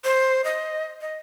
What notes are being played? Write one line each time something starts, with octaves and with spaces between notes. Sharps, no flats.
C5
D#5
D#5